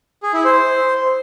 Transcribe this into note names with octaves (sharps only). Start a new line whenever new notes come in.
G#4
E4
C5